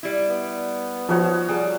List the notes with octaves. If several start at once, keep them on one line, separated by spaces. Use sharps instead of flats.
G3 E4
B3
F3 D#4 F#4 C#5
G3 G#4 A5